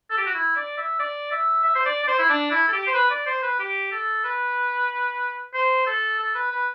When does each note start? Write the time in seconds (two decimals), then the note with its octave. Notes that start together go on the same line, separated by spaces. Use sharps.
0.10 A4
0.18 G4
0.26 F#4
0.34 E4
0.56 D5
0.77 E5
0.99 D5
1.31 E5
1.64 E5
1.75 C5
1.85 D5
2.03 D5
2.07 C5
2.18 E4
2.29 D4
2.51 E4
2.68 A4
2.72 G4
2.87 C5
2.94 B4
3.10 D5
3.26 C5
3.43 B4
3.59 G4
3.92 A4
4.24 B4
5.54 C5
5.86 A4
6.19 A4
6.35 B4
6.51 B4